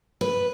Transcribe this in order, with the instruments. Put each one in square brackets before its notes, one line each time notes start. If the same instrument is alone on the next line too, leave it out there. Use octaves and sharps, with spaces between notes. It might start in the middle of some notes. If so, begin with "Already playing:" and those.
[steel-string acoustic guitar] B4